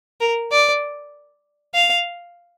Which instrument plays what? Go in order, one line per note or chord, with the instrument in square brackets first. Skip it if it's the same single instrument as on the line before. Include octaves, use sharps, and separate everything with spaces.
[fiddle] A#4
D5
F5